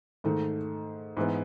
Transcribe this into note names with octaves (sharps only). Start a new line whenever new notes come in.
G#2 D#3 A3
G#2 E3 B3